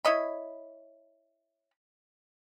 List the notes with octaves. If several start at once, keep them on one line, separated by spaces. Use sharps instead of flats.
E4 C#5 D#5 B5